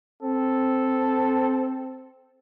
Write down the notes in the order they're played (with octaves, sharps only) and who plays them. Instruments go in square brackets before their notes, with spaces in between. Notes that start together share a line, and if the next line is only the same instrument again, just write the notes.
[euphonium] C4 [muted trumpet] A4